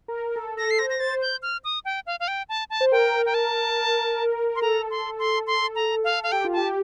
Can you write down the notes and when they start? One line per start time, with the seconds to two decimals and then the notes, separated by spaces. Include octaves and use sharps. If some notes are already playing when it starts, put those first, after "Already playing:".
0.08 A#4
0.36 A4
0.57 A4 A#6
0.71 C7
0.79 C5 A#6
0.90 A#6
1.00 C5 A6
1.21 G6
1.42 F6
1.64 D#6
1.85 G5
2.07 F5
2.20 F5
2.28 G5
2.49 A5
2.70 A5
2.81 C5
2.92 A#4 G5
3.26 G5
3.34 A5
4.56 C6
4.62 A4 A#5
4.90 C6
5.19 C6
5.47 C6
5.75 A#5
6.04 F5
6.23 F5
6.32 G4 G5
6.44 F4
6.53 G4 A5